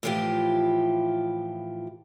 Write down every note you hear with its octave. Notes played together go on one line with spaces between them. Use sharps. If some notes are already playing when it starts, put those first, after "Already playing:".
A2 E3 F3 F4 G4